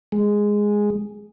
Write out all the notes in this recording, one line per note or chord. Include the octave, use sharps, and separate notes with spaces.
G#3